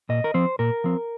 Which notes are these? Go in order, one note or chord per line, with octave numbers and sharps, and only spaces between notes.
A#2 D#5
A#4
F3 C4 C5
A#2 A#4
F3 C4